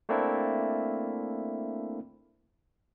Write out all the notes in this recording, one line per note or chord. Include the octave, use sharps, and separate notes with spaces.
A3 A#3 C4 D4 E4